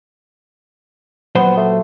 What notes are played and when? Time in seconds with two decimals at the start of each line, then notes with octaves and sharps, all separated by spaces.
1.35 A#2 F#3 B3 C5
1.57 A3